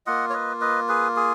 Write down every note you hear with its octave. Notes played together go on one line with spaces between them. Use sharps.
A#3 F4 D#5 F#5
C#5
B4 D#5
B4 D#5
G#4 B4
G#4